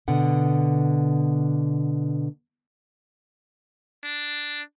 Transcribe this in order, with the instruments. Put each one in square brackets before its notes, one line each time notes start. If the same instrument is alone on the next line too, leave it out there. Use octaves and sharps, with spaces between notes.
[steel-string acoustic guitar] B2 D3 F#5
[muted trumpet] D4